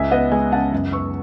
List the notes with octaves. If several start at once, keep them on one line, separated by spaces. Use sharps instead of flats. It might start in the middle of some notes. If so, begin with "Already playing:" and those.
Already playing: C#2 E5 G#5
B3 D#5 F#5
G#3 E5 G#5
C#3 F#5 A5
F#2
B3 C#6 E6